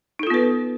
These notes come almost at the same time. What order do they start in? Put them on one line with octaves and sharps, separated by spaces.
D#4 A4 F4 B3 B4